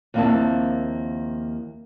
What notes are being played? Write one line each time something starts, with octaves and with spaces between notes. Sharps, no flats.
D#2 F3 A#3 C4 E4 A5